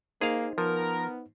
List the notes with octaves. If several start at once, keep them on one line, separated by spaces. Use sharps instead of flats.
A#3 D#4 G#4 C5 F5
F3 B3 A#4